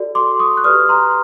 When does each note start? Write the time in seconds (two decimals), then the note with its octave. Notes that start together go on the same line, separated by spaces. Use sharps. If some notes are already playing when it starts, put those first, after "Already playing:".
Already playing: F#4 A4 D5
0.15 C6 D6
0.39 C#6 D#6
0.57 F#6
0.64 G4 B4 D5 D#6 F6
0.89 A#5 C6